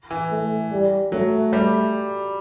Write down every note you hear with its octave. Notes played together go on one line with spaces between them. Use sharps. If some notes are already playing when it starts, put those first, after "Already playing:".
E3
A3
G3
F#3 A3
G3